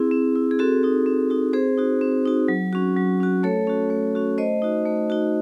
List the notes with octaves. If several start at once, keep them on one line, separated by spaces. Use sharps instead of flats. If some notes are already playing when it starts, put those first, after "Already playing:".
Already playing: C4 E4 G#4
C4
E4
G#4
C4 F#4 A4
D#4 F#4
C4
D#4 F#4
C4 G#4 C5
D#4 F#4
C4
D#4 F#4
F#3
C#4 F#4
F#3
C#4 F#4
A3 A4 C#5
C#4 F#4
A3
C#4 F#4
A3 C5 D#5
D#4 F#4
A3
D#4 F#4